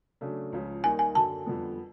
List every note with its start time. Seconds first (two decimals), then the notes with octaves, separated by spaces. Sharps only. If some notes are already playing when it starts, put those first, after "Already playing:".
0.21 C#3 F#3 A3 D4
0.53 C#2 C#3 F3
0.84 D#2 D#3 G3 A#3 D#4 G#5
0.99 G#5
1.15 F#2 D3 F#3 A5
1.46 F2 D3 G3 B3